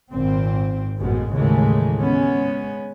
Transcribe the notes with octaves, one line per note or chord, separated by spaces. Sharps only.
G#1 A#2 C4
A1 F#2 B2 G#3
D#2 A2 C#3 E3 G#3 A3
G#3 B3 C#4